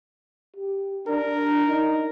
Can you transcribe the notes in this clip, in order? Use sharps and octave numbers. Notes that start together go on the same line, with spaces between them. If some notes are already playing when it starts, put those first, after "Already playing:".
G4
D4 A#4
D#4